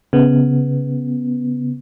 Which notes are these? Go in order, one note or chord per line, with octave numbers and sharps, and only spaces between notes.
C#3 B3